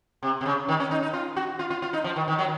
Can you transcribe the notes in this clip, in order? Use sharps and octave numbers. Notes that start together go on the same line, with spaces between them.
C3
C3
C#3
D#3
C#4
D#4
D#4
F4
F#4
F4
F4
F4
D#4
F3
D#3
D#3
F#3